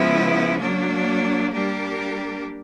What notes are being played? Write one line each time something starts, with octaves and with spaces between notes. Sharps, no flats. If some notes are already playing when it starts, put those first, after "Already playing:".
Already playing: C#3 F3 G#3 B3 E4
F#3 A#3 D4
G3 A#3 D4 G4 A#4